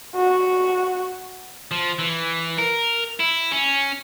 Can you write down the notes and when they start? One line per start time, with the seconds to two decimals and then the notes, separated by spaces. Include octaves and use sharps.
0.16 F#4
1.71 F3
1.99 E3
2.58 A#4
3.20 E4
3.52 C#4